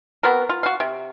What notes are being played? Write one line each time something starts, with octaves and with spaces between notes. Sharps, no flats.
B3 C4 F#4 A#4
F4
F#4 F5
C3